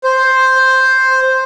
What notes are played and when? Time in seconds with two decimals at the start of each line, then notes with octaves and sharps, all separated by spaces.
0.04 C5